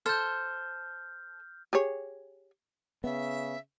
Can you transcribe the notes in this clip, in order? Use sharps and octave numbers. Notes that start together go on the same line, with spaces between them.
A4 C5 A5 F6 G6
G4 G#4 C#5
C#3 B3 E5